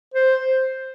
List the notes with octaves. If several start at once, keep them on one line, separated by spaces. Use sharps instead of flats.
C5